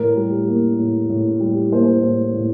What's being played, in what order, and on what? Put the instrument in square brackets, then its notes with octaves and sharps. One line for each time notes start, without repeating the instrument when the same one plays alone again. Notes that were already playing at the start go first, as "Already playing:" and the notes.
Already playing: [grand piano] A2 A#4
G3
A#3
A2
A2
G3
A#3 C5
A2
A2